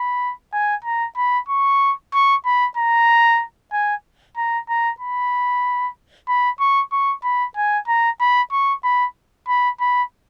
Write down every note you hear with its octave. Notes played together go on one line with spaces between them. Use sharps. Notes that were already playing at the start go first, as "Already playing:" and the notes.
Already playing: B5
G#5
A#5
B5
C#6
C#6
B5
A#5
G#5
A#5
A#5
B5
B5
C#6
C#6
B5
G#5
A#5
B5
C#6
B5
B5
B5